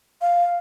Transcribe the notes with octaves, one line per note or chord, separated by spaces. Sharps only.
F5